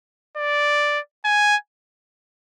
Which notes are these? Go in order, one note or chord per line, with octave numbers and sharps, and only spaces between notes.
D5
G#5